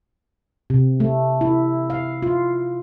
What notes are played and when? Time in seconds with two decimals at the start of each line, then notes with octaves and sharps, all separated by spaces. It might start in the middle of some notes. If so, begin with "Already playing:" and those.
0.70 C3
1.00 A3
1.41 E4
1.90 F5
2.22 F4